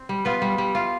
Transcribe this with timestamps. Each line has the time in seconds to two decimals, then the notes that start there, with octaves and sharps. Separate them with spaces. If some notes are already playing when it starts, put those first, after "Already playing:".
Already playing: C4
0.09 G3
0.25 B3 F4 B4
0.42 G3
0.58 G3
0.75 F4